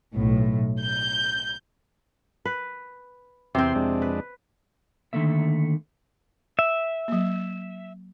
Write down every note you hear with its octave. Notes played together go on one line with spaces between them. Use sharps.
B1 A2
G6
B4
E2 C3 C4 C6
F2 G#3 D4
B4
D3 D#3 A3 A#3 E5
E5
F#3 A#3